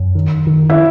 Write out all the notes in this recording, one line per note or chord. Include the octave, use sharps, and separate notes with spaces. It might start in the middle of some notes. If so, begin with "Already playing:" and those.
Already playing: F#2
D#3
D#3
E4